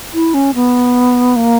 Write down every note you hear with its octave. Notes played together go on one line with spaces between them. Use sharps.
E4
C#4
B3
A#3